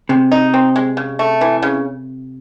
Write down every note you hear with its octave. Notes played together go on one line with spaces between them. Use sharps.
C3 G#3
D#4
C4
G#3
C#3
A3
E3
C#3